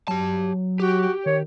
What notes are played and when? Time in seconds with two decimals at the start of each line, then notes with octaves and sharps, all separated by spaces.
0.08 F#3 G4 A5
0.80 F#4 G4
1.26 D#3 C#5